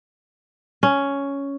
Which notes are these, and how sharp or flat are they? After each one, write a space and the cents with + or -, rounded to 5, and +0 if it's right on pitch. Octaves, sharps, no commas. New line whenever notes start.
C#4 +5